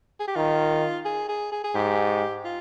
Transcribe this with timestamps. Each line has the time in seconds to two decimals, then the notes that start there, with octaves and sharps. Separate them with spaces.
0.20 G#4
0.27 G4
0.36 D#3 F4
1.05 G#4
1.29 G#4
1.52 G#4
1.64 G#4
1.75 G#2 G4
2.45 F4